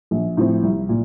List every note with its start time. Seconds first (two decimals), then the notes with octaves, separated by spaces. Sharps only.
0.11 A#1
0.37 A2 F3 C4
0.63 C2
0.89 A#2